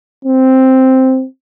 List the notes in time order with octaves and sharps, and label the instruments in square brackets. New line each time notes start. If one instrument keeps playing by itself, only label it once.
[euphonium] C4